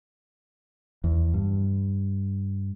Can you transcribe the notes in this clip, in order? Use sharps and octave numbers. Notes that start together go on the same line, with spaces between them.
E2
G2